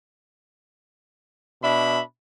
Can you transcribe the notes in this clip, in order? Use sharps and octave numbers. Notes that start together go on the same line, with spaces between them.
B2 D4 E5 B5